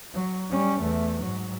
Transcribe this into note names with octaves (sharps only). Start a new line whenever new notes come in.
F#3
G3 C#4
E2 A3
G#2 F#3